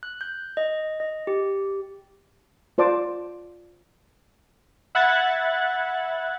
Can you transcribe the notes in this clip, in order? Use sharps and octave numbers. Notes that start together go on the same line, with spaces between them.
F#6
G6
D#5
D#5
G4
F4 C5 D5 A5 D6
E5 F#5 B5 F#6 G#6 A6